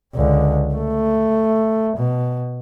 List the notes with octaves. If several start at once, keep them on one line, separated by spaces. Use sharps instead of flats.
C#2 D3
A3
B2